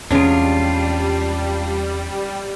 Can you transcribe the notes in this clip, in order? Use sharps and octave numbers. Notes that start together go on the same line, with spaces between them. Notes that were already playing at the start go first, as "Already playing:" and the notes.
E2 C3 G3 G#3 C#4 D4 F4